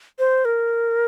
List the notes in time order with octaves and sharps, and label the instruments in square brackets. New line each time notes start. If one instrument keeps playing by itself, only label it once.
[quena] C5
A#4